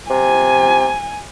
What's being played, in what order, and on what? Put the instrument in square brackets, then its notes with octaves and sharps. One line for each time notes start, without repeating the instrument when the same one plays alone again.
[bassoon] C3 [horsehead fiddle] G#5